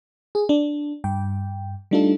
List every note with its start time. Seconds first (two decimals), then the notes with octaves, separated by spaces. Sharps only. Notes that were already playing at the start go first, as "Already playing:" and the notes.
0.35 G#4
0.49 D4
1.04 G2 G5
1.91 G3 A3 D4 D#4 F4 A4